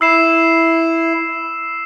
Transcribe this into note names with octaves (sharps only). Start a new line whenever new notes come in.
E4 E6 C7 E7